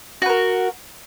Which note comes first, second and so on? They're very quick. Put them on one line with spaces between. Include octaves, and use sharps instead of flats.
F#4 B4 A#4